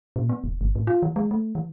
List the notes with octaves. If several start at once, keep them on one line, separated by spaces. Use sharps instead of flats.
A#2
B3
D#1
G1
A2
F4
E3
G#3
A3
E3